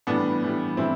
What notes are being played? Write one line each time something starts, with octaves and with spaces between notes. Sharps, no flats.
A2 E3 G3 B3 D4
A2 E3 G3
A2 E3 G3 C4 E4